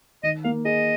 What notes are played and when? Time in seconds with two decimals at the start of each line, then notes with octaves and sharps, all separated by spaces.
0.23 D#3 D#5
0.44 A#3 F5
0.65 G#4 D#5